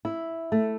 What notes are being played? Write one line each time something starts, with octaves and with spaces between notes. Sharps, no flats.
E4
A3